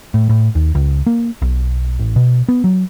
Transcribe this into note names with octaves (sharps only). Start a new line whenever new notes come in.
A2
A2
D#2
C#2
A#3
B1
A1
B2
B3
F#3